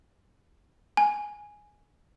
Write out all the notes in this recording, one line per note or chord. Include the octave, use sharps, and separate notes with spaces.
G#5